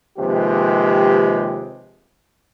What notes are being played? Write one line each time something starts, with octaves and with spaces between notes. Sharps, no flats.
D#2 C3 F3 G#3 G4 B4